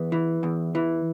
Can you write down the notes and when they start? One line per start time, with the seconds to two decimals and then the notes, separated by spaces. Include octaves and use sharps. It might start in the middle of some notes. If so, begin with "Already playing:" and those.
Already playing: E2 B3
0.12 E3
0.43 E2
0.75 E3